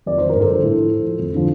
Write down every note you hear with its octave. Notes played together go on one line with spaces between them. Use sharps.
F2 D5
D#3 C5
G2 A#4
A4 C5
D3 F3
A2
F3
A2
F3
F2
D3 F3